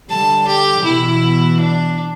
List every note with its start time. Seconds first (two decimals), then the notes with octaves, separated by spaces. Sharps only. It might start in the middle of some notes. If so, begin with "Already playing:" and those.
0.10 D3 G3 A5
0.47 G4
0.85 B2 E3 E4
1.60 D4